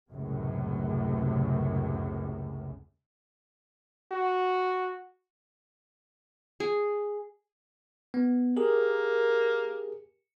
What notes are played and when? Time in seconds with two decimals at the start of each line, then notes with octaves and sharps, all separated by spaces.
0.12 C#2 F#2 A2 C3
4.12 F#4
6.60 G#4
8.14 B3
8.57 A#3 G4 G#4 A#4